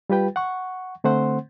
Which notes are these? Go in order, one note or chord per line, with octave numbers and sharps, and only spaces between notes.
G3 F4 G4 B4 G5
F#5 C#6
D3 A3 C4 C5 F#5 C6